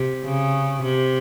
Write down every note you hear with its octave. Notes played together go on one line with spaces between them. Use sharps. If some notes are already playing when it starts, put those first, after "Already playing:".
Already playing: C3
C#3
C3